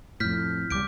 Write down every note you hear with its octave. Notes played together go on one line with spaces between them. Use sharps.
F2 A2 F6 G6 B6
C#2 G3 D6 G6 D7